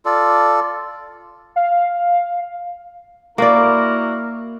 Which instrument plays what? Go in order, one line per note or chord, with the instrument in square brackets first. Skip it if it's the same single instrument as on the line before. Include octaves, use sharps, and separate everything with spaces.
[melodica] F4 A4 D5
[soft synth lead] F5
[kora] A#3 D5 [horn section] E4 F#4 A#4